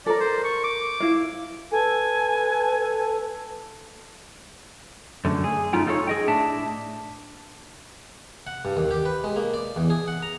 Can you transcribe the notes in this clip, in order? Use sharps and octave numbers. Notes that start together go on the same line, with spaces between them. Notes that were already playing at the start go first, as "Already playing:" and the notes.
A4 A#4 D5
C5
C#6
D6
E4 F5
A4 B4 G#5
F#2 D3 A3
G#4
F#2 A3 D#4 F4 G5
D#4 F4 A4 A#4 C#5
G#4 D#5 G5
A2 D4 E5 A5
F#5
G2
D#2
G4
B4
G#3
A#3
D5
E2
G#4
F#5
A#5